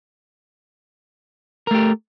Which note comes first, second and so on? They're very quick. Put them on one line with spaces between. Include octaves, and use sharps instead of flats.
A#4 A3 G4